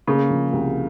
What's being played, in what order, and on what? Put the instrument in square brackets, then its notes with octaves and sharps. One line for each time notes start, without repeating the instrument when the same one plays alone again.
[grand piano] C#3 [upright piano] A#3
[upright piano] F3
C2